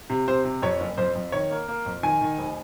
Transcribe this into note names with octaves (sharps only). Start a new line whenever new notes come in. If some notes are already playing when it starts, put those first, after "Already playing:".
C3
C3 C5
C3
F2 C#5
F#1
F2 C5
F2
D#3 C#5
A#3
A#3
F2
D#3 G#5
D#3
F1